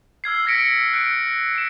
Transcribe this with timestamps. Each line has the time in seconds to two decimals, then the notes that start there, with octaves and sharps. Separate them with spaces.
0.24 E6 F6 G#6 C7
0.45 E6 G#6 A#6 B6 C#7 D7
0.93 F#6 C#7 D7
1.56 C#7 E7